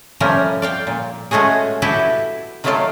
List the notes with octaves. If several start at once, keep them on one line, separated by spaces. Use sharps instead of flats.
F3 G3 A3 C#4 A#4
D5 F5 G5
A#2
G#3 A3 C#4 F#4 G#4
E4 F#4 G4 A4 B4 E5
D#3 F#3 A3 F4 A4 D5